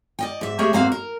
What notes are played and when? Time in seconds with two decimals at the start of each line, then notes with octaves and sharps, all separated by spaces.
0.19 D5 D#5 G5
0.41 G#2 E5
0.59 A3 A#3 G4 G#4 C#5 E5
0.73 E2 G#2 A#3 C4 F#4 F5
0.92 A#4